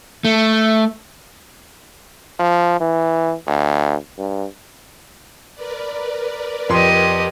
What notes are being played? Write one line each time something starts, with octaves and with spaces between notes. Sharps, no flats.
A3
F3
E3
D2
G2
A#4 B4 D5
F2 G4 D#5 C6